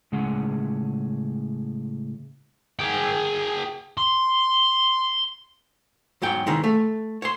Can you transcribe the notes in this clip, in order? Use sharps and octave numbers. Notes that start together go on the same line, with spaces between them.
A2 C#3 G#3 C#4 G#4 F#5
G#4 G5
C6
E2 G#2 F#3 G5
C3 D#3 E3 G#3 C#4
A3
C#5 C6